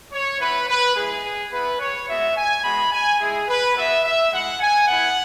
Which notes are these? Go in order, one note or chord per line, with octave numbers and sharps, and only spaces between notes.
C#5
B3 E4 B4
B4
G#3 E4 G#4
B3 E4 B4
C#5
G#3 B3 F#4 E5
G#5
G#3 B3 F#4 B5
G#5
G#3 E4 G#4
B4
B3 F#4 E5
E5
G#3 E4 F#5
G#5
B3 E4 F#5